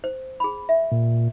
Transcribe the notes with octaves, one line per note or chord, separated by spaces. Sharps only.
C5
G#4 B5
E5
A#2